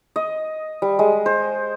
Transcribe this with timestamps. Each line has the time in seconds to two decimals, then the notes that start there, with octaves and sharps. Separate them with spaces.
0.16 D#5
0.82 G3
0.99 G#3
1.26 C5